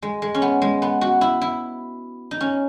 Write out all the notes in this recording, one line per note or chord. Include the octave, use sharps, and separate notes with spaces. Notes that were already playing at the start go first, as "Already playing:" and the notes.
G#3
G#3
C#4
B3
G#3
B3
F#4
E4
E4
D#4
C#4